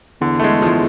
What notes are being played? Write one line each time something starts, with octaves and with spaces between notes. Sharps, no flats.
E2 D3
A3
G#3
F3
G#3